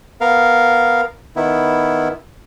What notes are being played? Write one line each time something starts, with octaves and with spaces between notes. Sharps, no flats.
B3 A#4 F5
D#3 B3 E4